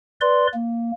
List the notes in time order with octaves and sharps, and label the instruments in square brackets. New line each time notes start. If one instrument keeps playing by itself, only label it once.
[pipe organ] B4 D5 C6
A#3